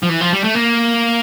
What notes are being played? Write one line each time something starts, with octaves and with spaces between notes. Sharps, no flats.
F3
E3
F3
G3
A3
A#3